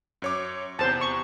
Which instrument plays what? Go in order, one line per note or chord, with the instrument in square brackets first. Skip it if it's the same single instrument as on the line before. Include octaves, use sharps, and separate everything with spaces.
[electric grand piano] F#2 C#5 D6
[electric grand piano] E2 C3 [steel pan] C5 A5
[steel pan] C#6